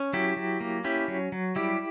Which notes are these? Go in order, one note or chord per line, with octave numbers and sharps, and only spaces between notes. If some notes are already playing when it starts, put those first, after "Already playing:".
Already playing: C#4
F#3 E4 G4
F#3
A#3
C#4 E4 G4
F#3
F#3
G3 E4 G4